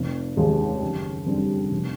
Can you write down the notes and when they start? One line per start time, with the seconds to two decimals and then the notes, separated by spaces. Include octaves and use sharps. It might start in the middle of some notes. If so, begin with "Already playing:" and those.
Already playing: F1
0.37 D#2 D#3 G#3
0.82 F#1
1.26 F2 D3 G3 C4
1.71 F1